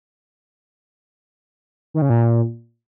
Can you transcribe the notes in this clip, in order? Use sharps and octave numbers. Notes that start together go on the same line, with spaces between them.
D#3
C#3
A#2